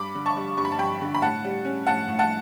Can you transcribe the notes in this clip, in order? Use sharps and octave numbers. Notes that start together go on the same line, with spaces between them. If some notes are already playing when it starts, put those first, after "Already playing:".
Already playing: G2 B5 D6
D3
A5 C#6
G3
G2 C#6
B5
A5
G2 G5 B5
D3
B5
A2 F#5 A5
G3
C#4
A2 F#5 A5
A2
F#5 A5